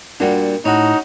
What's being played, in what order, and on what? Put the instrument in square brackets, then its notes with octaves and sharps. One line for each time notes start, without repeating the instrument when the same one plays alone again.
[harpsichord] A#2 G3 [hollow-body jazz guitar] D4 F#4 F#5
[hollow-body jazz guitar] A2 [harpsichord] C#4 F#4 [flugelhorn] D#4